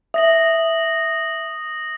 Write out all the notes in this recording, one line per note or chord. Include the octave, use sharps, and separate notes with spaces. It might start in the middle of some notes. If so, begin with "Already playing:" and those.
E5 D#6 A#6 F#7